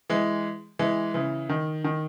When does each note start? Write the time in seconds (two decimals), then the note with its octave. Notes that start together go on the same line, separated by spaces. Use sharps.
0.10 E3 G#3
0.79 E3 G#3
1.14 C#3 E3
1.49 D#3
1.84 D#3